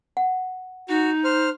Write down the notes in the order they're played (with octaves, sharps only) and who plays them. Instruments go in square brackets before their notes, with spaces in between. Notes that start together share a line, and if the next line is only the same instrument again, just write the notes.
[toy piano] F#5
[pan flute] D#4 [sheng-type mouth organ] F#4
[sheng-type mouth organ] C5 F6